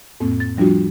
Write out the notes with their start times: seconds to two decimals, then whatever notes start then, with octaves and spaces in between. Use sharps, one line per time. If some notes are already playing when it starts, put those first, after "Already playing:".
0.20 F2 A2 A#3 C4
0.40 A6
0.57 F3 G3 D4 F4 F#4